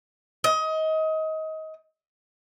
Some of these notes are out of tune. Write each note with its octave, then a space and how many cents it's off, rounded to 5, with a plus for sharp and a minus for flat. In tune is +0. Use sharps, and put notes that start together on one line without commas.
D#5 +25